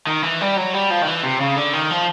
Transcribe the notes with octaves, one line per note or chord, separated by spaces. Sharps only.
D#3
E3
G3
F#3
G3
F3
D#3
E3
C3
C#3
D3
D#3
F3